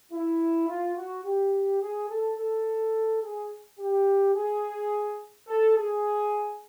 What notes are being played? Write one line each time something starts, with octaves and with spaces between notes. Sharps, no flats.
E4
F4
F#4
G4
G#4
A4
A4
G#4
G4
G#4
A4
G#4